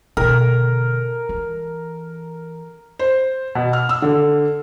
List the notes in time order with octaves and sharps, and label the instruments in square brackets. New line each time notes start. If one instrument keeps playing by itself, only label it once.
[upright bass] B2 D3 [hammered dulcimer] A#4
[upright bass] E3
[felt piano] C5
B2
F6
E6
D3